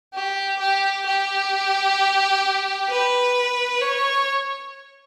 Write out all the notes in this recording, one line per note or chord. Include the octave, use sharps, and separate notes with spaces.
G4
G4
G4
B4
C#5